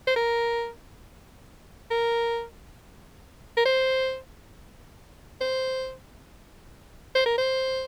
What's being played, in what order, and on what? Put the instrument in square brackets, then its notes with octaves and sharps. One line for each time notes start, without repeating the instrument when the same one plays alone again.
[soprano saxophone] C5
A#4
A#4
A#4
C5
C5
C5
A#4
C5